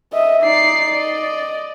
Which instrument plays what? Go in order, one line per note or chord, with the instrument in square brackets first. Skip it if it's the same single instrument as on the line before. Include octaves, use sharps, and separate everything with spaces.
[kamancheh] D#5 E5
[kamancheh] D#4 [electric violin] D5 C7
[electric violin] D5 [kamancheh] D#5